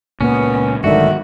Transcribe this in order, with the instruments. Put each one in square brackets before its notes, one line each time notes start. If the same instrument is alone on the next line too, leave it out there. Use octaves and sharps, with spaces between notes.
[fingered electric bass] C#2 A#2 A#3 [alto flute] B3 [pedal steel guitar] C#4
[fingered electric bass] B1 G#2 A3 [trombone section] D3 D#3 [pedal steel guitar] F#4 [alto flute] E5